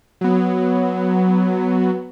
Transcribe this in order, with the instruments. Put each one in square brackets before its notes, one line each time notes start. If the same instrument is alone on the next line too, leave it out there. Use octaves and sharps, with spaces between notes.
[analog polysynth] F#3 B3